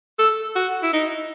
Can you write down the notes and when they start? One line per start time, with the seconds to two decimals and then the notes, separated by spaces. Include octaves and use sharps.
0.19 A4
0.56 F#4
0.83 E4
0.93 D#4